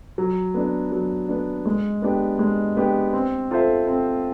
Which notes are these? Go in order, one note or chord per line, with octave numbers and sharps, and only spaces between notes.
F#3
B3 D4
F#3
B3 D4
G#3
B3 D4 G4
G#3
B3 D4 G4
C4
F4 A4 C5 E5
C4